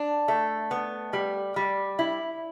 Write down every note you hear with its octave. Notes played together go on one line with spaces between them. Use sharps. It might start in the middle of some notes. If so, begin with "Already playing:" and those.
Already playing: D4
A3
B3
G3
G3
E4